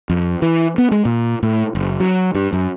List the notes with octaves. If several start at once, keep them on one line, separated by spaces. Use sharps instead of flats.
F2
E3
B3
G#3
A#2
A2
F#1
F#3
G2
F#2